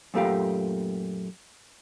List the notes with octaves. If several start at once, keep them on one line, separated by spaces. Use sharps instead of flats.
F#2 A#2 A3 A#3 G4 F5